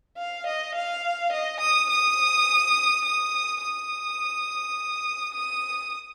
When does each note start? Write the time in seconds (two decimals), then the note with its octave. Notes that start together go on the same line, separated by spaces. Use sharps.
0.18 F5
0.47 D#5
0.75 F5
1.32 D#5
1.60 D#6
1.90 D#6
3.05 D#6
3.62 D#6
5.35 D#6